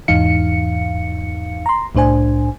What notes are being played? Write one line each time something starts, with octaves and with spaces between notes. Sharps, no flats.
E2 G#2 E3 D#4 F5 C#7
A#5 C6
C2 A2 D4 C5 G#5